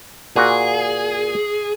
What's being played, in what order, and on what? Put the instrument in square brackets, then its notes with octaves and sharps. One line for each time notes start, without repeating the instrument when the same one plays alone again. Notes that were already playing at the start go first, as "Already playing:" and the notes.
[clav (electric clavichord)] A#2 F#4 [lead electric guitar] G#4